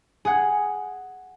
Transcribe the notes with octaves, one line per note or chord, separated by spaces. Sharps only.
G#4 F#5